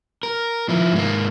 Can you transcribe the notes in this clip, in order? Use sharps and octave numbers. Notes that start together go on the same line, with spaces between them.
A#4
F3 E4
G#2 A#3